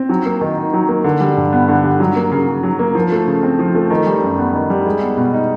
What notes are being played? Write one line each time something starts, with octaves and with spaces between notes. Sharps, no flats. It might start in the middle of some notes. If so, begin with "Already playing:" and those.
Already playing: C4
F#3
A#3
D#3
D#4
F#3
A#3
D3
G3
G2
B3
D3
G3
F#3
A#3
C#3
C#3
F#3
A#3
F3
A3
C#3
C4
F3
A3
D#3
G3
F#2
B3
D#3
G3
G#3
B3
B2
D#4